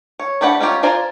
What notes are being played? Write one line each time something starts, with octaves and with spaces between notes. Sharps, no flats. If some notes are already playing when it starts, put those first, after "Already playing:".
C#5
A3 D4 G4 B4 F#5
C#4 D#4 F4 G4
F4 C5 D5 G#5 A#5